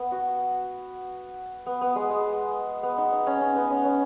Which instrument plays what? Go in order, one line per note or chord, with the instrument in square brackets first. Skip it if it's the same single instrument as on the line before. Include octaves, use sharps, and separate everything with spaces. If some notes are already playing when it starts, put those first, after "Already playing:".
Already playing: [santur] B3
F#4
B3
B3
G#3
G#3
B3
D#4
D#4
C#4
C#4
B3
C#4
C#4